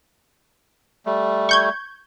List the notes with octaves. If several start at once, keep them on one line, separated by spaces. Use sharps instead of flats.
G3 A3
C#6 G6 G#6